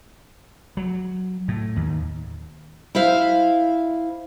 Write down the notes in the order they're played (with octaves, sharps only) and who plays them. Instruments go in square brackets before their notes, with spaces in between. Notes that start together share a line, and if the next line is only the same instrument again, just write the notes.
[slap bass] F#3
A2
D#2
[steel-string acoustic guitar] E4 C5 E5 F5